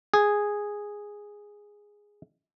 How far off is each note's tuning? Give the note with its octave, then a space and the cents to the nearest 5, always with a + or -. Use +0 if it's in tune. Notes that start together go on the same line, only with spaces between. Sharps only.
G#4 -5